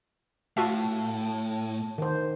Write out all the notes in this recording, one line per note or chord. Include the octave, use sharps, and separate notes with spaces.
A2 F4 F#4 E5 A5
D#3 C5